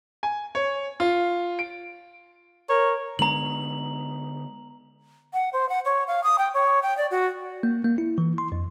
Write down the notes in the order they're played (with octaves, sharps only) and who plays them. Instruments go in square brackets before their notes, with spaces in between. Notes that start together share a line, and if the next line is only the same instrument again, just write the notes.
[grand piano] G#5
C#5
F4
D7
[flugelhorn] A#4 [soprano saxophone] C#5
[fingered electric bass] D3 G#3 B3 [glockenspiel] A#5 F#7
[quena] F#5
C5
F#5
C#5
F5
D#6
G5
C#5
G5
D5
F#4
[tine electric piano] A#3
A#3
E4
E3
C6
F2